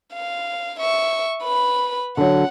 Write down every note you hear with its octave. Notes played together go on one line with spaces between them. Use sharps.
F5
E5 C#6
B4 B5
D3 F#3 F#5